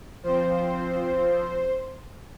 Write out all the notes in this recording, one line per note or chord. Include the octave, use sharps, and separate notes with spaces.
F3 C4 C5